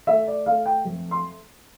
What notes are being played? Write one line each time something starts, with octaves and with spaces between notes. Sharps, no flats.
A3 E5
D5
A3 F5
G5
F2
C6